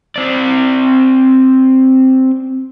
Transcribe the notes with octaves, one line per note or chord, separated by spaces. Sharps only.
C4 D5